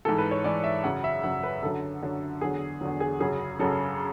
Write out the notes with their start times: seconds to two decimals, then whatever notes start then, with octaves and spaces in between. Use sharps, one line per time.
0.05 G#2 E3 A4
0.18 B4
0.31 C#5
0.44 G#2 E3 D5
0.64 E5
0.84 F#2 C#3 F#3 F#5
1.04 E5
1.23 F#2 C#3 F#3 F#5
1.43 B4
1.63 F#2 D3 F#3 A4
2.02 F#2 D3 F#3
2.41 E2 D3 F#3 G#4
2.81 E2 D3 F#3
3.00 G#4
3.20 F#2 C#3 F#3 G#4
3.59 F#2 C#3 F#3 A4